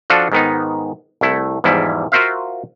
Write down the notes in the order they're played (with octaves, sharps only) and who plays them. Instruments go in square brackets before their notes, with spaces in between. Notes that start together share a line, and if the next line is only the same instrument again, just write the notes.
[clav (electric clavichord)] F3 D4 F4 F#4 A4
G#2 D#3 B3 D#4
C2 A3 E4
E2 G#2 F3 G3 E4
F4 F#4 A#4 C5 E5 F5